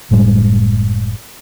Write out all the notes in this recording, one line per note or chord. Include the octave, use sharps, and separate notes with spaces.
F#1 A2 G3 G#3